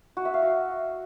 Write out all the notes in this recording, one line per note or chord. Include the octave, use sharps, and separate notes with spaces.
F#4
E5
F5
F#4